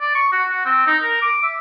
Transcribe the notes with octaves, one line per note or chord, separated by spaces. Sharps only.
D5
C#6
F#4
F#4
C4
D#4
A#4
D6
E5